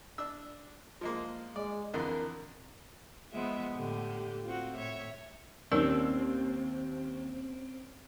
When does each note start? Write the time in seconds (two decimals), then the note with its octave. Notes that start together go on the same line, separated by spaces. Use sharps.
0.18 D4 E6
1.01 F3 G#3 A#3
1.56 G#3 D5
1.94 F2 D3 E3 A#4
3.33 F3 G#3 B3 E5
3.76 A2 D3 A3 G4
4.45 C4 F4 F#4
4.75 A2 C#5 E5
5.72 D#2 C4 C#4 D#4 A#4 D5 E6